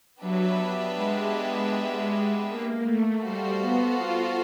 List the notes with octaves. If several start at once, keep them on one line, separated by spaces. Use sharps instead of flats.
F#3 B3 D4 G4 B4 E5
G#3
A#3
A3
G3 F#4 A4 C5 F5
B3
F4